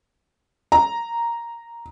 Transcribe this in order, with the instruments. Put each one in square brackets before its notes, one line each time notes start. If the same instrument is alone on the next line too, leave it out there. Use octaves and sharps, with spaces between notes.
[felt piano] A#5